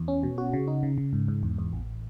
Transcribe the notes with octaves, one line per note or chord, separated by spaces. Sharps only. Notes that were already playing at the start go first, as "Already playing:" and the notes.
Already playing: E2
C#4
B2
F#4
C#3
D#4
C#3
C#3
G#2
G#2
E2
E2
A1